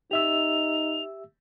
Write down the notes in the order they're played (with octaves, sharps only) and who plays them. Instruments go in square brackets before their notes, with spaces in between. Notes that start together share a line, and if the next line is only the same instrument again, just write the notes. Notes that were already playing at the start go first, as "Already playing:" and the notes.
[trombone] D#4 [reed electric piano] G4 E5 E6 [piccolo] F7